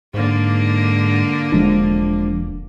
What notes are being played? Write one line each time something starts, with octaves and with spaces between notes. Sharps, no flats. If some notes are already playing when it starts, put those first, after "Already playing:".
G#2 D3 A#3
E1 F3 G#3 D4